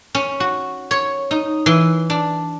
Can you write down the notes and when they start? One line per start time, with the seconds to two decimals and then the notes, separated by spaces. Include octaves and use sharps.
0.15 C#4
0.40 F#4
0.91 C#5
1.31 D#4
1.66 E3
2.10 D4